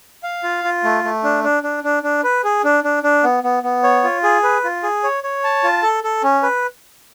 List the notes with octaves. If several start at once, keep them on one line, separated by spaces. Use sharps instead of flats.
F5
F4
F4
A3
A3
D4
D4
D4
D4
D4
B4
G#4
D4
D4
D4
B3
B3
B3
C#5
F4
G#4
B4
F4
G#4
C#5
C#5
A5
F4
A4
A4
C#4
B4